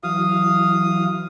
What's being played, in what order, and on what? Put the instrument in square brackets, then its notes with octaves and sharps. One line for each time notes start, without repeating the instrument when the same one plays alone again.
[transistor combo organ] E3 F#3 [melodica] F5 D#6